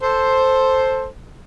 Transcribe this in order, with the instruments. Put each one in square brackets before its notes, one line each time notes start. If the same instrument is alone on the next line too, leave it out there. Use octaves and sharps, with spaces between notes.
[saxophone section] A4 C5